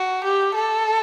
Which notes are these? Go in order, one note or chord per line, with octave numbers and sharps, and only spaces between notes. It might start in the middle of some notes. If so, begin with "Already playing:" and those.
Already playing: F#4
G4
A4